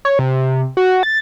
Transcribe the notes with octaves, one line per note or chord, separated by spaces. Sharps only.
C#5
C3
F#4
A6